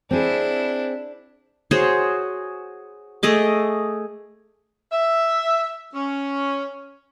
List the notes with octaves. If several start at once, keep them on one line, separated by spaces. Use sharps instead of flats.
C4 D4 E4 G#4
F#4 G#4 C5 C#5
A3 G#4 D#5 D6
E5
C#4